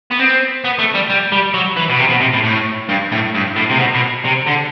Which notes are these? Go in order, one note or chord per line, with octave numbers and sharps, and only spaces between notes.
B3
C4
B3
A3
G3
G3
G3
F#3
E3
B2
C3
B2
C3
A2
A2
G2
A2
G2
A2
C3
B2
B2
C3
D3